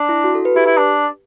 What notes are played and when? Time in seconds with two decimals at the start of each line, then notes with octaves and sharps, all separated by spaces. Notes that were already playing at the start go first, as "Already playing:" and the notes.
Already playing: D4
0.09 E4
0.24 F#4
0.35 A4
0.45 B4
0.56 E4 G4
0.66 E4
0.77 D4